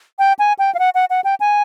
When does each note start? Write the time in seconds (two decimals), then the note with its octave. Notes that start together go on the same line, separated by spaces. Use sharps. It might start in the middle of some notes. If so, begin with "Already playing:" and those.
0.19 G5
0.39 G#5
0.59 G5
0.75 F5
0.79 F#5
0.95 F#5
1.10 F#5
1.24 G5
1.40 G#5